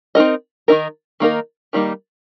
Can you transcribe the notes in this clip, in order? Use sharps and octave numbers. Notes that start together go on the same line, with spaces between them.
C4 D#4 A#4 D#5
D#3 A#3 D#4 A#4
D#3 A#3 D#4 A#4
D#3 G3 A#3 D#4